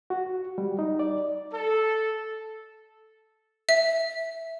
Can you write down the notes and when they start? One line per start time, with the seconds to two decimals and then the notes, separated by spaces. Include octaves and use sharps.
0.10 F#4
0.58 G3
0.79 D#4
0.99 D5
1.53 A4
3.69 E5